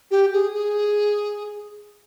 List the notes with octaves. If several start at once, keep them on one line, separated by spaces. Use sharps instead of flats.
G4
G#4
G#4